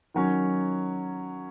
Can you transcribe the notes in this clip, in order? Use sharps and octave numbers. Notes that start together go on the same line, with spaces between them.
D#3 F#3 C#4